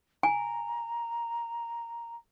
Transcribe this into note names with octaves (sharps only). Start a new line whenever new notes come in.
G#5 A#5